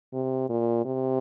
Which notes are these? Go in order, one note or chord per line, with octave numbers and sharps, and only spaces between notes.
C3
A#2
C3